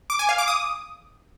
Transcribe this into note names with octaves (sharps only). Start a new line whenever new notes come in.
D6
G#5
F5
D6
D#6